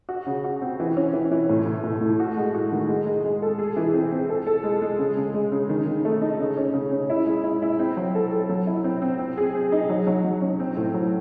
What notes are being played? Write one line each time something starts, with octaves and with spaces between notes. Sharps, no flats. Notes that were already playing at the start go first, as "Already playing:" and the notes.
F#4
C#3
F#4
C4
E3
C#4
E3
E3
A2
A2
A2
A2
F#4
G#3
F#4
D#3
G#3
G#3
G#3
A4
G#4
E3
C4
C4
A4
A4
G#3
G#3
C#3
C#3
G#3
C#3
D#3
D#3
A3
D#4
C#3
C#4
C#3
C#3
E4
G#3
E4
E4
C4
F#3
A4
A4
F#3
E4
C4
C4
C4
G#4
C4
D#4
F#3
F#3
F#3
C#4
C4
A2
F#3